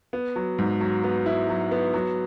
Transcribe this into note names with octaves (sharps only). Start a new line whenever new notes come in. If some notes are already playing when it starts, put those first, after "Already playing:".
B3
F#3
G#2
F#3
B3
E4
F#3
B3
F#3